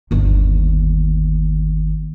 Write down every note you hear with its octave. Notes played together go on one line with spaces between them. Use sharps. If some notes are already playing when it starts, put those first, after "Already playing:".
G1 D#2